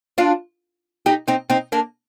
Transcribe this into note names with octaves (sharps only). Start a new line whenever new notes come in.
D4 F4
D#4 G4
C4 D#4
C4 D#4
A#3 D4